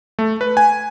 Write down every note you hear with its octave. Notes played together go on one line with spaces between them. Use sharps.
A3
B4
G#5